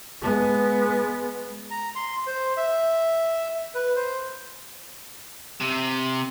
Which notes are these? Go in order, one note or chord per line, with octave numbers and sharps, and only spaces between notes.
G#3 B3
A#5
C6
C5
E5
B4
C5
C3